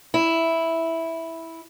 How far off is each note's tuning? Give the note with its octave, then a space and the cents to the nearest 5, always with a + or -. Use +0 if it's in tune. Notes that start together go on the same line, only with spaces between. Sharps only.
E4 -5